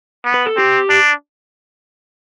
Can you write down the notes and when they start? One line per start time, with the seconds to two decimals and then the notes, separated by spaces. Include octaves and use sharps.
0.25 B3
0.34 B4
0.46 A4
0.57 C4 G4
0.89 D4